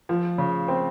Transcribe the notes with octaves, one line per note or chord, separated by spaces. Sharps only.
F3
C#3
C4